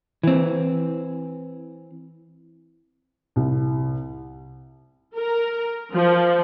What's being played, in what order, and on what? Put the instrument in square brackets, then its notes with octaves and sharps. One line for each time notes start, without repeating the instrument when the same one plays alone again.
[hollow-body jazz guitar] E3 C4
[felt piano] C2
[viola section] A#4
F3